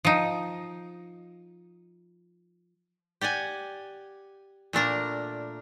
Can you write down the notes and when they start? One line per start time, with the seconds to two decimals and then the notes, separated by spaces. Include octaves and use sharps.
0.05 F3 D#4
3.21 G4 D5 F#5 G#5
4.73 A#2 A3 D4 A#4